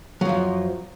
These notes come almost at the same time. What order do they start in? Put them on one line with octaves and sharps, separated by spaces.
F#3 F3 F#2